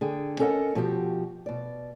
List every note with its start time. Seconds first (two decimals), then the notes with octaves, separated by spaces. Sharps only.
0.01 D3 G#4 G5
0.39 C#4 A4 A#4 D#5 F#5
0.75 B2 F3 F#4 G4 G5
1.46 B2 D5